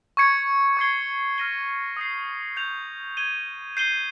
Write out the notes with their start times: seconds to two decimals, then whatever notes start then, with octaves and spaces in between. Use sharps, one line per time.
0.17 C#6 G#6 C#7
0.77 C#6 G#6 C7 G7
1.38 F6 A#6 D#7 G7
1.97 D#6 G6 C7
2.57 G6 C7 F7
3.17 G#6 D#7 G7
3.77 G6 C7 D#7 G7